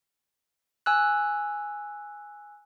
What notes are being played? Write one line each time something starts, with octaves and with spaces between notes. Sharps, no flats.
G#5 E6 F#6